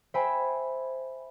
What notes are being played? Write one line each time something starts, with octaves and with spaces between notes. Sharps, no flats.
C5 E5 G5 G#5 B5